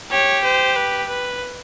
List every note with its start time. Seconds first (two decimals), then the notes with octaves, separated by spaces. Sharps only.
0.11 G4 C#5
0.44 C5
0.76 B4
1.09 B4